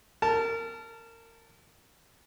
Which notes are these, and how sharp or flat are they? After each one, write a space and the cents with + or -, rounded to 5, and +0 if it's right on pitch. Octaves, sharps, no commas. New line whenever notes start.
A#4 -25 A5 -5